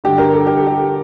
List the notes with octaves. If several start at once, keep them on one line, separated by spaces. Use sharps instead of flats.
G2 D3 G4
A#4
A4
G4
A4
G4